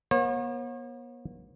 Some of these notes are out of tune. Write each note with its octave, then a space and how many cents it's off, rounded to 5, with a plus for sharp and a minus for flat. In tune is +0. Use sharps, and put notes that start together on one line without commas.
B3 -45 C#5 -40